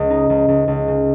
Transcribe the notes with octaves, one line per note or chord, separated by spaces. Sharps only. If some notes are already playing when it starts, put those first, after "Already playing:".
Already playing: C#2
D#4
C#2
C#2
C#2
C#3